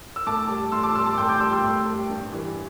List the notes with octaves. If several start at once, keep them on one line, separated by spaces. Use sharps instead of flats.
E6
A2 A5 D6
G3
A2 C6 E6
A5 D6
G3 C6 E6
A5 D6
A2 G5 C6
D6 G6
G3 C6 E6
C6 E6
A2
G3
G2
E3 G3